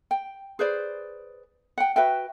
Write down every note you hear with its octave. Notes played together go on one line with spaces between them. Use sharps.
G5
G#4 B4 C5 D5
F#5 G5
F#4 B4 E5 G5